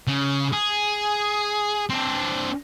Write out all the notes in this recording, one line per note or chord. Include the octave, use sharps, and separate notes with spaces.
C#3
G#4
C4 D4